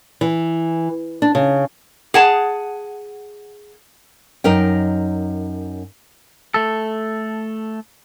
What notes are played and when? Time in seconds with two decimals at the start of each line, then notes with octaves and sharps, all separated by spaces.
0.21 E3
1.22 D4
1.35 C#3
2.14 G#4 F#5 A5
4.44 F#2 D#4 A#4 D#5 G5
6.54 A3 A4